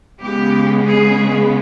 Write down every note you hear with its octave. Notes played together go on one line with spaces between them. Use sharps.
C#3 G#3 B3 G4
G#4